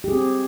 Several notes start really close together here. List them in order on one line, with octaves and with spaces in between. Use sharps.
G4 G#4 C4